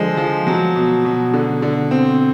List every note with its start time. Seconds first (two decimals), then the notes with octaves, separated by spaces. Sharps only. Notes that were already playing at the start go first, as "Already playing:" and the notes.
Already playing: D3 F3 G#3
0.17 F3
0.47 F#3
0.76 B2
1.05 B2
1.33 D3
1.62 D3
1.91 C4